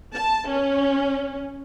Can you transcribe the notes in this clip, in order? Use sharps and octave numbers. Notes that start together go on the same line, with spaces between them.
A5
C#4